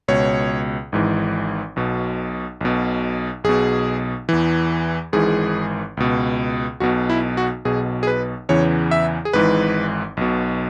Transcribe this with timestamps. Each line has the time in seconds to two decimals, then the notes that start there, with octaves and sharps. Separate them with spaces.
0.08 C#2 B2 C#5
0.92 G#1 G#2 E3
1.76 B1 B2
2.61 B1 B2
3.44 B1 B2 G#4
4.29 E2 E3
5.13 G#1 G#2 E3 G#4
5.97 C#2 B2
6.80 B1 B2 F#4
7.10 E4
7.37 F#4
7.65 B1 B2 G#4
8.03 G#4
8.07 B4
8.49 E2 C#3 E3 C#5
8.91 E5
9.25 G#4
9.33 G#1 G#2 E3 B4
10.17 B1 B2